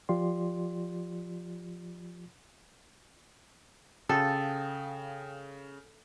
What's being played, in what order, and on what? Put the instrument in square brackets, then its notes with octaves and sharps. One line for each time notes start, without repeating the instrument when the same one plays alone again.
[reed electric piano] F3 F4 G4 D5 C6
[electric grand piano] C#3 [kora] A4 [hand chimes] F5 G5 D#6